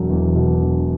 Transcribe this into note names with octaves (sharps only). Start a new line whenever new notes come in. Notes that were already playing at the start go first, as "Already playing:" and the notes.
Already playing: E1 F#3
E2
B2
E1